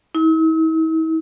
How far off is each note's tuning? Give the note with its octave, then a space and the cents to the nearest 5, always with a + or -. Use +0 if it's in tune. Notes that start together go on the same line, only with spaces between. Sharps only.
E4 -45